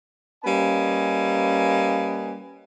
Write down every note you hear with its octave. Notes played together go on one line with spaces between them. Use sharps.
G3 A#3 C#4 B4 D#5 G#5